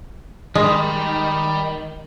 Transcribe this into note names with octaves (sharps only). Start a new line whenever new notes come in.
D#3 G3 G#3